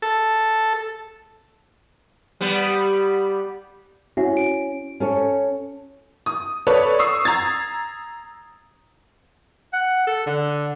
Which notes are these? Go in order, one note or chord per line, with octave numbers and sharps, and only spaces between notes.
A4
G3 B3
C#4 E4 F#4
D7
C#4 A4 C#5
D#6
A4 B4 C#5 D5
C#6 D#6 E6 C7
A#5 G#6 A6
F#5
A4
D3